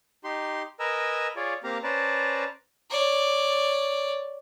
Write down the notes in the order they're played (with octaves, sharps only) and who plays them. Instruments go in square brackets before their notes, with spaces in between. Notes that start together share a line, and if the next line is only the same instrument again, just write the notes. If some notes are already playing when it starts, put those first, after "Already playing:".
[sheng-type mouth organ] D#4 G4 C6
A#4 B4 D#5 G#5 A#5 E6
F4 G#4 C#5 D5
A#3 C4 G4 F5 A#5
C#4 B4 C5 D5 A5 A#5
[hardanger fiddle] C#5 D5